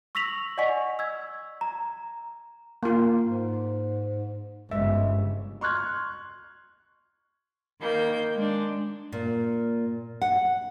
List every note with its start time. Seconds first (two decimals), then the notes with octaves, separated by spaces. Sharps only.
0.15 C#6 E6 A#6 B6 F7 F#7
0.58 D5 D#5 F#5 G#5 C#6 B6
0.99 E6 G#6
1.61 A#5
2.83 A#3 F4
3.21 G#2
4.71 G1 G#2 C#3 G#3 E5
5.61 C6 C#6 F6 F#6 G#6
7.80 D#3 A#3 G6
8.36 G#3 D4
9.12 A#2
10.22 F#5